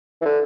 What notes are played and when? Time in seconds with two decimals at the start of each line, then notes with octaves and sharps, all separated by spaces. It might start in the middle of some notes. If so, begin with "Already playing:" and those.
0.22 E3
0.25 D3